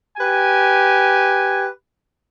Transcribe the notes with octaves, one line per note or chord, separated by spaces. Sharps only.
G4 B4 G#5